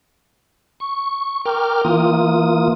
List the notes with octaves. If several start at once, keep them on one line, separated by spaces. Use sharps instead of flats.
C#6
A#4 G5 D6 F6
E3 A#3 F4 D#6